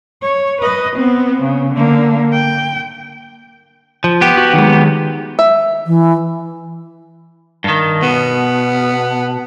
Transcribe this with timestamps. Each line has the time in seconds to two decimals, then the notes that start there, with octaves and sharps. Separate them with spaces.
0.22 C#5
0.61 B4 D#5
0.96 B3 C4
1.42 C#3
1.74 D3 A#3
2.33 G5
4.04 F3
4.21 B3 G4
4.37 F#4
4.54 D#3 F#3 G#3
5.39 E5
5.87 E3
7.64 G2 D#3
8.03 B2 B3